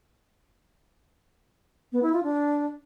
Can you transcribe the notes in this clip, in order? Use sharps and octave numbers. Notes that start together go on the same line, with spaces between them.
B3
E4
F4
D4